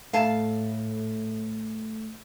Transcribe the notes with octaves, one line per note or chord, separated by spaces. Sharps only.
A2 A3 F5 A5